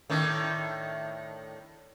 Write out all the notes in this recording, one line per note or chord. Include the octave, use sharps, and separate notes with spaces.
A2 D#3 D4